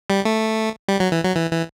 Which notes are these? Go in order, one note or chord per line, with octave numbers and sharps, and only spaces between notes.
G3
A3
G3
F#3
E3
F#3
E3
E3